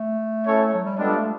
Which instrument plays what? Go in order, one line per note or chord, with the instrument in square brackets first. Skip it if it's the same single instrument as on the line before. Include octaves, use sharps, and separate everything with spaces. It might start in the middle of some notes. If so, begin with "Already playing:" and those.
Already playing: [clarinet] A3
[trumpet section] C#4 E4 A4 C#5
[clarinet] F#3
G3
[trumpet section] G3 B3 D4 F4 A4 [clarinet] G#3
[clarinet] A3